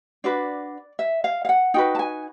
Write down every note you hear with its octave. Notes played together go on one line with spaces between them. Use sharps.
D4 F#4 B4 D5
E5
F5
F5
F#5
D#4 F#4 B4 G5
A5
G#5